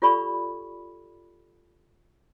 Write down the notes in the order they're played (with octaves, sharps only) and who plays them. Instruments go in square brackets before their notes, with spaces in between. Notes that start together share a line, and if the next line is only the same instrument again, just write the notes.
[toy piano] F4 G4 A4 D5 B5 C#6